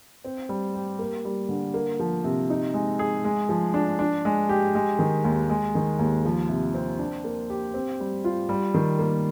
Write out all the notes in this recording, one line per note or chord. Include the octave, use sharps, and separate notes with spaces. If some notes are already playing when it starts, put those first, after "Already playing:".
C4
G3
G4
A#3
G3
D3
A#3
F3
C3
D#4
G#3
G#4
G#3
F3
D4
D4
G#3
G4
G#3
D#3
D#2
G#3
D#3
D#2
F3
C3
C4
D4
A#3
G4
C4
G3
F4
G3
D#3
A#3